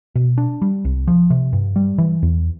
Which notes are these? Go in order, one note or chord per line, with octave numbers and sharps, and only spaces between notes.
B2
D4
G3
C2
F3
C3
G2
G3
E3
E2